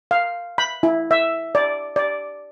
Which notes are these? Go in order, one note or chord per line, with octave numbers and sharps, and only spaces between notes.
F5
B5
E4
E5
D5
D5